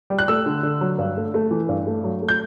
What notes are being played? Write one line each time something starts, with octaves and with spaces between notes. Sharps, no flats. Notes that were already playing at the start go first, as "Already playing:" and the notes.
G3
F#6
A3 E6
D3
D3
F#3
G2
A3
A3
E3
G2
A3
F#3
A3
G6